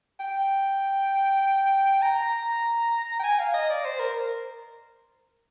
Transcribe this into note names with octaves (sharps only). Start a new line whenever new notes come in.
G5
A#5
G5
G#5
F5
D#5
D5
C5
A#4